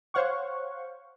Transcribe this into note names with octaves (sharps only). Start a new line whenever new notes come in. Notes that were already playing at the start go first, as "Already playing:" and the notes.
C5 C#5 F5 F#5 C#6